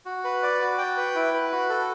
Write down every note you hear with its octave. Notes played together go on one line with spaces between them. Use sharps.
F#4
B4
D5
F#4
G5
B4
E4
B4
F#4
A4